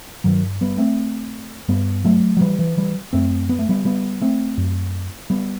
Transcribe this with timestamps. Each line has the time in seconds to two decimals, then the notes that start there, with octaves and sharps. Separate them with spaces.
0.24 G2 D#3 F#3
0.61 G3 B3
0.78 A3 C4
1.68 G2 G3 B3
2.05 F#3 A3
2.37 F#3
2.41 E3 G3
2.59 E3
2.78 E3 G3
3.13 F#2 A3 C4
3.49 B3
3.59 A3
3.69 G3 B3
3.85 G3 B3
4.22 A3 C4
4.58 F#2
5.30 G3 B3